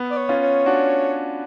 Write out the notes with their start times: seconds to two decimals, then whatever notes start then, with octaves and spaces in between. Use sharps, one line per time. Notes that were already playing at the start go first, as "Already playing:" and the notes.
Already playing: B3
0.10 D5
0.17 C#5
0.29 C#4 F4
0.41 C#5
0.66 D4 F#4